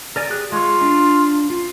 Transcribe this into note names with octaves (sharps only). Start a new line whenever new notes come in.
A#4 D5 G#5
G4 G#4 F#6
G#3 F4 C#6
D4
F4